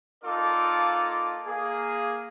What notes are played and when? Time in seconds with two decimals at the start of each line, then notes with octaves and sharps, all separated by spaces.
0.24 A#3 D#4 F4 A4 D5 D6
1.47 A#3 G#4